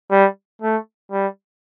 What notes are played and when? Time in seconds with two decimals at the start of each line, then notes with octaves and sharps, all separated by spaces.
0.11 G3
0.62 A3
1.12 G3